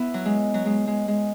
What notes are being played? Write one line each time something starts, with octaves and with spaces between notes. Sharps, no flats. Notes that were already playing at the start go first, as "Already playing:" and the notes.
Already playing: B3 E4
F#3
G#3
F#3
G#3
G#3
G#3